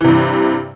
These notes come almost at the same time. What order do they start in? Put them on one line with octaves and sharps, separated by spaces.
E3 C3 G2